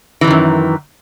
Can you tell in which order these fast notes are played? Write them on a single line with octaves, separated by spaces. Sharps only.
E3 C3 D#3 F#2